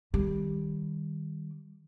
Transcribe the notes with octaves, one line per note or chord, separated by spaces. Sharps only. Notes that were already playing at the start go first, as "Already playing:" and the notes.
D#3 G3